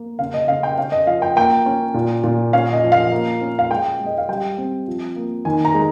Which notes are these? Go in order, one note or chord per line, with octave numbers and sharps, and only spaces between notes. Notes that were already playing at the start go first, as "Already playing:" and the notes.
Already playing: A#3
C#3 F5
D#5
C#3 F5
G5
C#4 F5
D#5
F3 F5
G5
A#3 G5
C#4
A#2
A#2
C#4 F5
D#5
F3
F5
A#3
C#4
F5
G#3 G5
G#3
D#5
F5
G3 G5
C4
F3
A#3
D#3 G#5
A#5
G#3